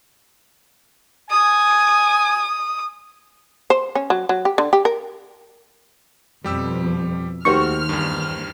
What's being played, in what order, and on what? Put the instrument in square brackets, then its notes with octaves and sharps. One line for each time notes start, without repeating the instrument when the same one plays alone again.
[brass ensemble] G#5 [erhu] D#6
[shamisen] C5
C#4
F#3
F#3
G4
D3
G4
A#4
[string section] F2 B2 [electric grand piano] G3 G4 E6
[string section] D#2 F6 [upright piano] D#3 G4 C5 [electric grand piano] A3 F#4 [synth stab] C#6
[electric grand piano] E2 G2